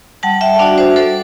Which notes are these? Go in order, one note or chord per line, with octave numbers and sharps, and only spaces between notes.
G3 F#5 A5
E5 G5
D4 F#4 D5 F#5
C5 E5
G3 A4 C5